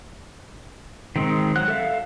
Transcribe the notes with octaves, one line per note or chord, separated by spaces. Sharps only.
D#3 G#3 C4
F#3 F#5 F#6
A4 E5 F5